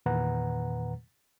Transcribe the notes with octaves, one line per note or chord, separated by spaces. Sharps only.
E2 A#2 D#3 B4 F#5 A#5